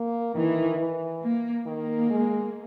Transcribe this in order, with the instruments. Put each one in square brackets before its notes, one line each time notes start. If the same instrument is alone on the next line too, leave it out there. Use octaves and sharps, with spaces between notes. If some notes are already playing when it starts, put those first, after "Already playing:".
Already playing: [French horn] A#3
[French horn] D#3 [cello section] E3
[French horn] E3
[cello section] A#3
[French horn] D#3 [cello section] A#3
[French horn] G#3